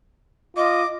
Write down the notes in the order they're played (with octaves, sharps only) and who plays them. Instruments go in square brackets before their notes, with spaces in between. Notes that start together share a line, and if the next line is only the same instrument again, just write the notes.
[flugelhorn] F4 [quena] D#5 [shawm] D6